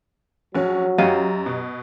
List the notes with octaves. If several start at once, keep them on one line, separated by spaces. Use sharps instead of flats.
A#1 F#3 C#4
F#2 G4 D#5 F5
B2